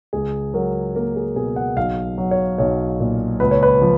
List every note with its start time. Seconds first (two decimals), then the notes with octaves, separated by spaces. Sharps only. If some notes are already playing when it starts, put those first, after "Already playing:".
0.13 C#2 G#4
0.54 F#3 A#4
0.96 A#3 A#4
1.16 G#4
1.36 B2 G#4
1.56 F#5
1.76 B1 F5
2.18 F#3
2.31 C#5
2.58 B1 C#5
3.00 A#2
3.40 C#2 B4
3.51 C#5
3.63 B4
3.82 F3